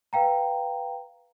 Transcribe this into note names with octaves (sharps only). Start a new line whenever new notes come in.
B4 F5 G5 A#5